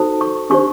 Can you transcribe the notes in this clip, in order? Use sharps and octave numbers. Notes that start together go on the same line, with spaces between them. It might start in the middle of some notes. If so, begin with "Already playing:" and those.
Already playing: D#4 F#4 A4 C5
C#6
D4 G4 C5 C#6